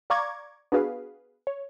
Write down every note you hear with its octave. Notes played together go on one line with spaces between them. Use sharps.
D5 F5 A#5 C#6 D6 G#6
B3 D4 F#4 G#4 B4 F5
C#5